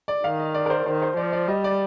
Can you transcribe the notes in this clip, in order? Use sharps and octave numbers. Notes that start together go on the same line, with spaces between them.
D5
D#3 F5
D#5
D5
A#4
C5
D#3 C5
C5
F3 D5
D5
G3 D#5
D5